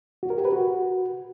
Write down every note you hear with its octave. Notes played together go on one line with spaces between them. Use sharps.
F#4
A#4
G4
B4
F#4